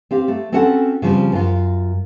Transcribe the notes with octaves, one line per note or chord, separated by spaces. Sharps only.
C4 G4 F5
A3
C4 C#4 F#4 A4 F#5
C#3 F3 G3 C4
F#2 F4